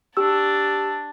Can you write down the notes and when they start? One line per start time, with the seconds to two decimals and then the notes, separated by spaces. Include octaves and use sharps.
0.17 D4 G4 A5 E6